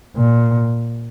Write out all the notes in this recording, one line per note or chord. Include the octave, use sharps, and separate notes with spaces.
A#2